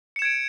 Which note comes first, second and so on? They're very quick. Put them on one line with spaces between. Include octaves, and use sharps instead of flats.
C#7 E7 G#6 D7